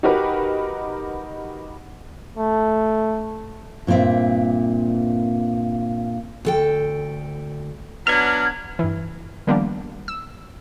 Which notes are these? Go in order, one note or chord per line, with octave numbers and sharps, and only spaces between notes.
D#4 F#4 G4 A#4 B4
A3
G2 A#2 F3 C4 E5
D2 A4 G5
F#3 B3 D4 F6 G#6
G2 E3
D#3 F3 G3 A#3 B3 D4
E6